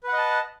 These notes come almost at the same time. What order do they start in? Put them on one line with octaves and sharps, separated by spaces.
B4 F#5 D#5 A5